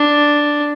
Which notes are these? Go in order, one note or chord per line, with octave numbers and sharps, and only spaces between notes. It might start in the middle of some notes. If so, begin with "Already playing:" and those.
Already playing: D4